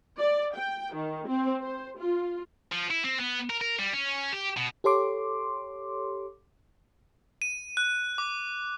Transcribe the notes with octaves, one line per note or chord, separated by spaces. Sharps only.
D5
G5
D#3
C4
C5
F4
F3
E4
C4
B3
A#4
A#4
G3
C#4
G4
B2
G4 A4 C#5 C6 D6
D#7
F#6
D6